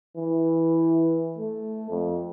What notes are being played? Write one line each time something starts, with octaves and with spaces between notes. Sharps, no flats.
E3
A3
F2